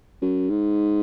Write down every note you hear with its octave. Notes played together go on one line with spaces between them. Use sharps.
F#2
G#2